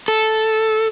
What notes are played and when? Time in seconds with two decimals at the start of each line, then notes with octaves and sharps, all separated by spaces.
0.08 A4